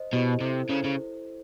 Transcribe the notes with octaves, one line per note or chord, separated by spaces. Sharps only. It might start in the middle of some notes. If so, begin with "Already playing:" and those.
Already playing: C5 D#5
B2 E4 G4 C5 D#5
C3 E4 A4 C5
C#3 E4 A4 C5
C#3